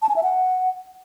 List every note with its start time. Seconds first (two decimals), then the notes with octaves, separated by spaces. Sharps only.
0.02 A5
0.09 G#5
0.16 E5
0.23 F#5